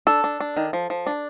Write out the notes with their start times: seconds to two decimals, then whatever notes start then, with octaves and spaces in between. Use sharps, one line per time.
0.07 D4 A4
0.24 D4
0.40 D4
0.57 D#3
0.73 F3
0.90 F3
1.07 D4